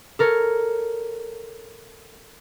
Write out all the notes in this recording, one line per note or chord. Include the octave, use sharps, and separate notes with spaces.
A4 A#4 C#5 C#7